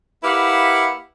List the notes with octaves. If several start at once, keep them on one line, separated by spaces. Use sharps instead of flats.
A#3 E4 G4 B4 F5 F#5